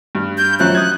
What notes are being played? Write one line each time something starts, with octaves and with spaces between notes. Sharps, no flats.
G2
G6
F#2 F3 C#4 F#6
D#6 G#6